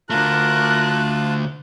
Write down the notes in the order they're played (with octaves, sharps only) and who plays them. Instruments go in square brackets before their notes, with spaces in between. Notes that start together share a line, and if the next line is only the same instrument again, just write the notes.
[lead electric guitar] D3 A3 [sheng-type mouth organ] F4 A5 [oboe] A#4 [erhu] F#6